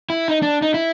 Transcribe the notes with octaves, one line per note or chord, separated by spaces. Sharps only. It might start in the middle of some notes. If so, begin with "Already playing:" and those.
E4
D#4
D4
D#4
E4